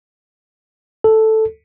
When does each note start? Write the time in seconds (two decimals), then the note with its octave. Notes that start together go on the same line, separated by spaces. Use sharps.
1.04 A4